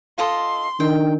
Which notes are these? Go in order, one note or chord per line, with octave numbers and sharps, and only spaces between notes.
F4 A4 D#5 C6
D#3 D4 G5